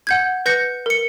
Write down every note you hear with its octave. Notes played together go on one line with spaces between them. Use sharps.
F#5 G6 G#6
B4 G6 A#6 C#7
A#4 C#7